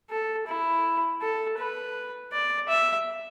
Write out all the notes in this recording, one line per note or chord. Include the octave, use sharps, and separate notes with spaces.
A4
E4
A4
B4
D5
E5